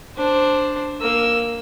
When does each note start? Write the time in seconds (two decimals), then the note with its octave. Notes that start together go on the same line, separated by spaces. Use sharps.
0.16 D4 C5
1.01 A#3 E6